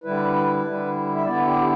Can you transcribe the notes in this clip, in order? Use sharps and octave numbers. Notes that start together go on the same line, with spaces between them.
D3 G3 E4 B4
D3 G3 E4
E5
D3 B3 E4 D5
G4